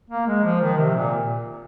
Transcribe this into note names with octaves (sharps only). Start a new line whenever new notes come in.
A#3
G#3
F3
D#3
C3
A#2